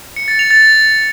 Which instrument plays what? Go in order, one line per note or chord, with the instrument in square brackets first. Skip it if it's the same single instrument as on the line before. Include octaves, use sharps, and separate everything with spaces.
[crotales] C#7
A6
F7
A6